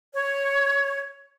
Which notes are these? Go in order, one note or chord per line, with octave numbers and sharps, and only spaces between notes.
C#5